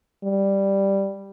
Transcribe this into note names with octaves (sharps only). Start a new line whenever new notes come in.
G3